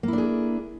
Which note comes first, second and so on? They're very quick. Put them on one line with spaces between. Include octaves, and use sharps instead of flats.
A#3 E4 D4 G#4